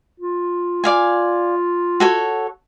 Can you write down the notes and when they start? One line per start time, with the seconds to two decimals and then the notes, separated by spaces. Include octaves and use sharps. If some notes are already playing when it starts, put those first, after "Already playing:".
0.20 F4
0.84 D5 F5 G#5
2.00 F#4 A4 C#5